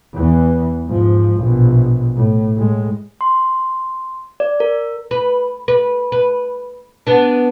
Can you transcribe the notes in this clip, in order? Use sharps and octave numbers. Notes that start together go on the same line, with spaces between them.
E2 E3
G#2 F3
A#1 B2
A2
A2 G#3
C6
D5
A#4
B4
B4
B4
B3 D4